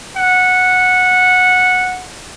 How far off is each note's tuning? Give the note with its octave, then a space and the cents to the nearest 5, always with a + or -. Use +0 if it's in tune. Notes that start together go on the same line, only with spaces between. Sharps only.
F#5 -10